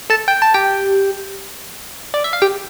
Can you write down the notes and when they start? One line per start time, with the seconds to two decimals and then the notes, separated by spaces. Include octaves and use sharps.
0.10 A4 A5
0.28 G5
0.42 A5
0.54 G4 G5
2.14 D5
2.24 E5
2.33 F5
2.42 G4 G5